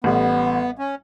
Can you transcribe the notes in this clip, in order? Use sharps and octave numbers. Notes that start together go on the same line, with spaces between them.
A1 A2 G3 B3
C#4